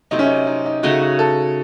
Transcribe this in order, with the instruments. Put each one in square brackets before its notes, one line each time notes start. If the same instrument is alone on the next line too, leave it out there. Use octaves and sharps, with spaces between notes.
[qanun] C3 F#3 A3 C4 [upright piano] D#4
[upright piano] C#4
D#4
D#4
D#4
[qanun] C#3 A3 D#4 [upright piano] F#4
[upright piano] F#4
A4